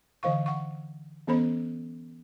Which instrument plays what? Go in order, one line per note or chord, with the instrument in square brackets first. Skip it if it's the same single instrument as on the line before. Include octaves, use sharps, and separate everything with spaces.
[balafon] D3 E3 C5 F5 C#6
F#5 C#6
E3 B3 C#4 A4 C5 B5